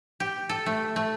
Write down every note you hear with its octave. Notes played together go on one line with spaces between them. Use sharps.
G4
A4
A3
A3